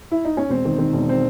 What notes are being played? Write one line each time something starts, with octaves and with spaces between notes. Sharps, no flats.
E4
D#4
C#4
E1 C4
D#3
D#3 C4
E1
C4